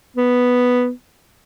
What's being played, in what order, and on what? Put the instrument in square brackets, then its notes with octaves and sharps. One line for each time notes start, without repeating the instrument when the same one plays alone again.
[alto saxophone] B3